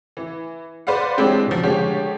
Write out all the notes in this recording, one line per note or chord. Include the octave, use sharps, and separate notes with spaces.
E3
B4 C5 D5 F5 F#5
E3 F#3 G#3 C4 D4 G4
B2 F3
D3 F3 G#3 G4 C#5